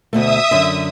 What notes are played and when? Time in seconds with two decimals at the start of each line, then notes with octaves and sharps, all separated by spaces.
0.13 D2 B2 A3 E5 D#6
0.51 F#2 D3